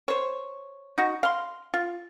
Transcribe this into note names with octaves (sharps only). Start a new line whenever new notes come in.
C5 C#5
D#4 F#4
F5 C6
F4